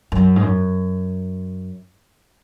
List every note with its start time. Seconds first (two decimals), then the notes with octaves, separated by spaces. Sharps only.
0.12 F#2
0.36 G#2
0.43 F#2